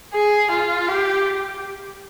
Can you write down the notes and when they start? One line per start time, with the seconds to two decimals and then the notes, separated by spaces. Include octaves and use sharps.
0.14 G#4
0.52 F4
0.88 G4